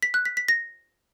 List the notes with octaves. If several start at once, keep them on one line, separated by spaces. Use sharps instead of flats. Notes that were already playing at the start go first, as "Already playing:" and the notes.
B6
F#6
B6
B6
A#6